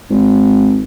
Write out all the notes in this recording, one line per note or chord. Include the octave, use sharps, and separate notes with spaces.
G#1